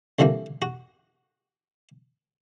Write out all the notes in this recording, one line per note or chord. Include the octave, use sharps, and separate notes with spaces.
C2 D3 E3 F3 A#3
F#4